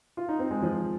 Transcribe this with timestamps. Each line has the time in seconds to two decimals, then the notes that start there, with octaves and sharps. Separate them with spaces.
0.17 F4
0.28 D#4
0.39 C4
0.51 G#3
0.62 F3